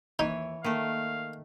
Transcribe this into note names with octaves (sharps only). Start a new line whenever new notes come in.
D#2 E3 D#4 C#5
D#3 A3 A#3 F5